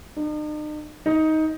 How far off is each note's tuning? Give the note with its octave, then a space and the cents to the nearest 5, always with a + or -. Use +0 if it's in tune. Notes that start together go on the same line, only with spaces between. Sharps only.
D#4 -45
D#4 +15